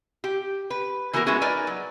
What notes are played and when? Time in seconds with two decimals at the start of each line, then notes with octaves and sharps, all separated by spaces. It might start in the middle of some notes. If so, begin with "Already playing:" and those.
0.24 G4
0.70 B4
1.13 E3 A#3 B3 F#4 A#4
1.27 G#3 B3 C#4 E4 F#4 G#4
1.41 D#4 A#4 B4 D5 G#5
1.67 F#3